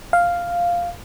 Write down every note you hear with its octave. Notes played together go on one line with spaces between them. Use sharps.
F5